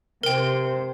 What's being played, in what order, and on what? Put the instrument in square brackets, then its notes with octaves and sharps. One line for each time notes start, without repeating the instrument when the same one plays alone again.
[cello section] C3 C5 [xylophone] A#4 G5